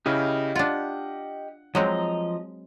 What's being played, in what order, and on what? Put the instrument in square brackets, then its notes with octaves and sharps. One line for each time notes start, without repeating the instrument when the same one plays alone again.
[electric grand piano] C#3 E4 [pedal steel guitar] G4 D#5 F5
[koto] D4 F4 [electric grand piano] F#5
[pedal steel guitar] F3 D#5 A#5 [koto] F#3 G#3 C4